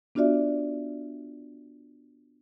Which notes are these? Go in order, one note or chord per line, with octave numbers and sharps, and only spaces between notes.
B3 D4 F4 F#4 D5 E5